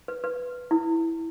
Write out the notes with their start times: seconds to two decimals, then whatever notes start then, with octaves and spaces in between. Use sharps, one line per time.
0.08 B4
0.24 B4
0.71 E4